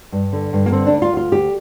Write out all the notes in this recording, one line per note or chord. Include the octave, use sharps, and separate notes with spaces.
G2
D3
G2
A#3
D3 C4
D4
D2
F4
D2 F4
D2 G4